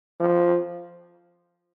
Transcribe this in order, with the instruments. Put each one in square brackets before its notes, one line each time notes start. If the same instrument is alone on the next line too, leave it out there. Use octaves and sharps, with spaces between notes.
[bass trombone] F3